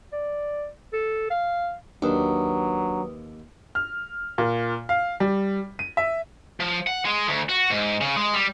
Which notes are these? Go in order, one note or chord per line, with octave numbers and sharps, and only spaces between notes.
D5
A4
F5
D#2 F#3 D4 B4 G5 D#6
F6
A#2
F5
G3
D#7
E5
F3
F#5
G#3
D2
F#4
G#2
C#3
G#3
G3